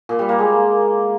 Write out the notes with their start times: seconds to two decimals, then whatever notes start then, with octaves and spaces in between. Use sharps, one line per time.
0.09 A#2
0.19 G3
0.29 A#3
0.39 G#3